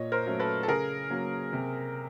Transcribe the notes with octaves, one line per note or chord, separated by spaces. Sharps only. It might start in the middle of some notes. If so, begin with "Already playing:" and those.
Already playing: A#2 C#5 D#5
A#4 C5
F#3 A3 C#4
A4 B4
A4
C#3 G#4 A#4
F#3 A#3 C#4
C3